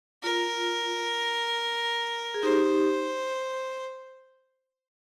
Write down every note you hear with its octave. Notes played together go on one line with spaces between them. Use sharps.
F4 A#4
G#4
D#4 G4 C5